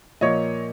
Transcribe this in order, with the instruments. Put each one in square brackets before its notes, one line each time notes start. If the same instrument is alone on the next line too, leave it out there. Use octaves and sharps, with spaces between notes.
[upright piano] A#2 F3 A#3 C#5 D#5